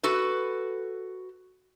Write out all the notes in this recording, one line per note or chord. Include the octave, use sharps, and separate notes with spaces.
F#4 A4 B4